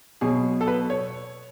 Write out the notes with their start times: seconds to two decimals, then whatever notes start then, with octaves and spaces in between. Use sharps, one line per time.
0.21 B2 F#3 G#4
0.61 A4
0.68 B4
0.90 C#5